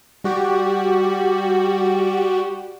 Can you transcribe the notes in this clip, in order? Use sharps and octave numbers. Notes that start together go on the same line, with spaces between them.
G3 F#4 G4